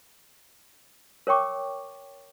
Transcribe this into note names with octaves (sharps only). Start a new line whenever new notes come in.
A#4 C#5 G5 C#6 D6